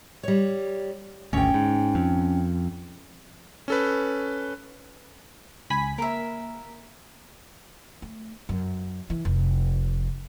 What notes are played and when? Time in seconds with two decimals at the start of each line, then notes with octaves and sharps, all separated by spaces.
0.23 G3 C#5
1.33 G#1 D2 C#4 G5
1.54 G#2
1.95 F2
3.68 C#4 A4 B4
5.70 C#2 G#5 B5 B6
5.98 A#3 A#4 E5
8.02 A3
8.49 F#2
9.10 E3
9.25 F1